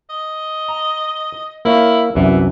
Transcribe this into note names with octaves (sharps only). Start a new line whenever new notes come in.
D#5
A#5
A#3 E4 C#5 F5
C2 F#2 E3